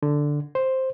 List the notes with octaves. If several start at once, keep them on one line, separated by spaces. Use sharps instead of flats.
D3
C5